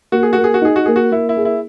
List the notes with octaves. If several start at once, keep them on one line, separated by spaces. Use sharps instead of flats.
A#3 F#4
G#4
A#3 F#4
G#4
F#4
D#4 G#4
F#4
A#3 G#4
F#4
A#3 E4
E4
G#4
E4